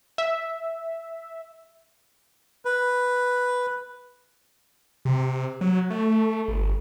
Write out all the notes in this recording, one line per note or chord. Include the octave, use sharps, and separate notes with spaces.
E5
B4
C3
F#3
A3
G1